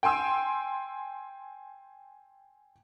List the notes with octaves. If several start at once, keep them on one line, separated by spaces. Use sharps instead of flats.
G5 G#5 C6 E6